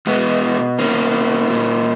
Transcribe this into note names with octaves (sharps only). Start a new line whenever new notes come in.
B2 G#3 B3
A#3 C#4
A#2